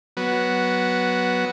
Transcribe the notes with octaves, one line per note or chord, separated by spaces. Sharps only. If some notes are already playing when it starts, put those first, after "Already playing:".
F#3 B3